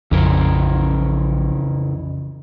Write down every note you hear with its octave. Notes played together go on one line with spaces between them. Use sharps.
A#1 F2 C#3 E3 A#4